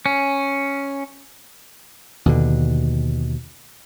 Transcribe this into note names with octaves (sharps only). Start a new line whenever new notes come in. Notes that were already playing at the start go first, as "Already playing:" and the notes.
C#4
D#2 B2 D3